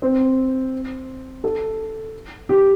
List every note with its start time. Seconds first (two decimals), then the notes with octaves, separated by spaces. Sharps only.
0.02 C4
1.44 A4
2.49 G4